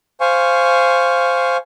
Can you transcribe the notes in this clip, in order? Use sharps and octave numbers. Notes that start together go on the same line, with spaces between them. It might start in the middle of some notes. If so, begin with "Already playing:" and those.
C5 F5 G#5 C#6